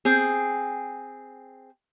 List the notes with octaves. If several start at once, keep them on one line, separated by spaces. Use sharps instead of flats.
C4 G#4